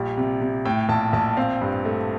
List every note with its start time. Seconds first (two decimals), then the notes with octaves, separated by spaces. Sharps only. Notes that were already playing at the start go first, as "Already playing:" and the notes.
Already playing: A#1 G3
0.17 C3
0.41 C3
0.65 A2 G5
0.89 A#1 A5
1.13 A#1 A5
1.37 C4 F5
1.61 G2
1.85 A3